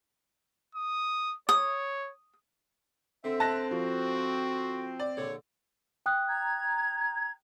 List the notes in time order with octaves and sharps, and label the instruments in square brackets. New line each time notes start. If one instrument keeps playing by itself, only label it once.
[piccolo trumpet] D#6
[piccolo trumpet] C#5 [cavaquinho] D#6
[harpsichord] D3 [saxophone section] C4 [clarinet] E5
[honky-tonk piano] A5 F#6 A#6
[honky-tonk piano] F3 [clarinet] F#4
[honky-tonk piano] D5
[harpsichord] A#1 D3 [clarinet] C#5
[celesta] G5 D#6 F#6
[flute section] A#5 G#6